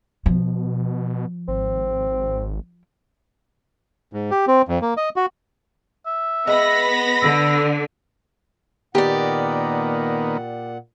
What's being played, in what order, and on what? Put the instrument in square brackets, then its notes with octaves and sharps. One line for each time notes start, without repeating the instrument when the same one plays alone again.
[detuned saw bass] B2 [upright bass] F3
[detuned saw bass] G#1 [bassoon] C4
[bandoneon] G#2
G4
C4
F2
A#3
D#5
F#4
[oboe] E5
[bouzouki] G#3 [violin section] B3 B5 A#6
[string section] D3 [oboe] E6
[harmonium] A#2 F#5 [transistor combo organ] D#3 A#3 B3 [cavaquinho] G4 D5